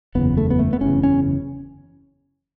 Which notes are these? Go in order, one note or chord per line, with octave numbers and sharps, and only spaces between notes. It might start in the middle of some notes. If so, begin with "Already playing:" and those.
F#1 E2 C#3 B3
A3
B3
A3
B3
F#1 E2 C#3 C#4
C#4